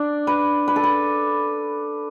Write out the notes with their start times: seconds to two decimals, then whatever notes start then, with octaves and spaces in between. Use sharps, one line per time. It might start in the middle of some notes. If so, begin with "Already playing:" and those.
Already playing: D4
0.27 B4
0.68 B4
0.76 A4
0.83 B4